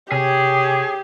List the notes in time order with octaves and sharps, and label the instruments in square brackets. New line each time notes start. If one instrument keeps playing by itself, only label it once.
[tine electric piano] C3 [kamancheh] G4 [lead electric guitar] G#4 [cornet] C#5